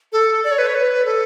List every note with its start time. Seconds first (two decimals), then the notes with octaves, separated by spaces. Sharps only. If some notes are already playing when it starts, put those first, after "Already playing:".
0.13 A4
0.44 D5
0.51 C#5
0.58 B4
0.67 C#5
0.75 B4
1.06 A4